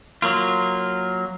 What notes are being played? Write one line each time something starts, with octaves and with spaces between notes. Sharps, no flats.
F#3 A#3 F4